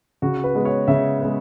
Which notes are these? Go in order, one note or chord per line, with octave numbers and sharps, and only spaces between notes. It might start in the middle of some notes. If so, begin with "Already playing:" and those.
C#3 F#4
B4
G#3 B3
C#5
C#3 E5
G#3 B3